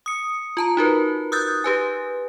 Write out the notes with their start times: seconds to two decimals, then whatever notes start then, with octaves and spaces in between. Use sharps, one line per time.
0.06 D#6 C#7
0.57 F4 A5 A#5
0.77 D#4 F#4 A#4 B4
1.32 D#6 E6 F#6 G6 A6
1.64 G4 B4 G#5